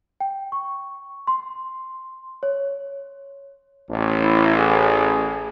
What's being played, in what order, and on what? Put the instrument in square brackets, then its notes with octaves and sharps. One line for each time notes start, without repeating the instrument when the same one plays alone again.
[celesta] G5
C#6
C6
C#5
[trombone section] A1
[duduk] E4
G#4